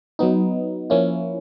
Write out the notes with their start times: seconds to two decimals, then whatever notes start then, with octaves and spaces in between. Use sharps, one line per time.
0.19 F#3 B3 D#4
0.90 F3 A#3 C#4 E4